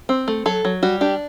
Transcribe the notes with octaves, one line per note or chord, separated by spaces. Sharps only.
C4
A3
F#3 A4
F#3
G3 F#4
D4 G4